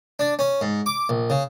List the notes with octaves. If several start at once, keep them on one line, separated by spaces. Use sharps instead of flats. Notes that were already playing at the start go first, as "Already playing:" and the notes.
D4
C#4
G#2
D6
A#1
C#3